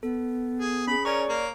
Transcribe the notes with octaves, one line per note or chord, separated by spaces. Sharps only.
B3 A4
G#4
C#4 G#4 B5
C#4 A#4 C#5 D5 C#6
A#3